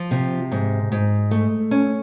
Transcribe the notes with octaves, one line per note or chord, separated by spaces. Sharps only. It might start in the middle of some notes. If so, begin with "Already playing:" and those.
Already playing: F3
C3
G#2
G#2
A3
C#4